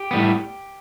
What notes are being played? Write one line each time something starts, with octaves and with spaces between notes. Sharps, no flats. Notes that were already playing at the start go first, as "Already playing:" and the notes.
Already playing: G4
A2 G3 B3